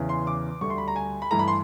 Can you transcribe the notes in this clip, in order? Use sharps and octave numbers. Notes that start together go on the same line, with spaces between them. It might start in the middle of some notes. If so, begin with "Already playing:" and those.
Already playing: E2 C#3 E3
C6
D6
D2 D3 G3 C#6
C6
B5
A#5
G#5
B5
G2 E3 A3 A#5
B5
C6